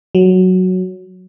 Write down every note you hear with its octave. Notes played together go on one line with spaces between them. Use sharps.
F#3